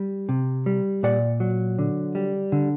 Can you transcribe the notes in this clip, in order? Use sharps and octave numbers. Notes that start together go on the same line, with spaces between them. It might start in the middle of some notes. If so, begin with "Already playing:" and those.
Already playing: G3
C3
G3
A#2 D5 F#5
F#3
D3
G3
D3